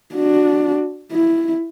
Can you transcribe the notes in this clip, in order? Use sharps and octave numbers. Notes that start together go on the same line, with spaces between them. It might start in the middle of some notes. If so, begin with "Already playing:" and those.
D4 F#4
E4